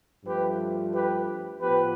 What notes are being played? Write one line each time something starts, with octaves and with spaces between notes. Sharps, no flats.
G2 F3 A3 G4 B4
G4 B4
A2 F3 B3 G4 B4